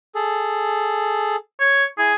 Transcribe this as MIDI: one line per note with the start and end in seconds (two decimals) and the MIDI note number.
0.15 1.36 68
0.15 1.36 69
1.60 1.84 73
1.98 2.13 64
1.98 2.15 68